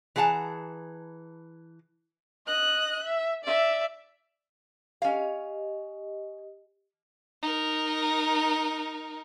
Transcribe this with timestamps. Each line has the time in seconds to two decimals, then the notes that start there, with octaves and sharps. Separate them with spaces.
0.16 E3 G#4 F#5 A5 A#5
2.47 D#5 F#6
3.03 E5
3.44 D5 E5
5.02 C#4 G4 D#5 F5
7.42 D#4 A#4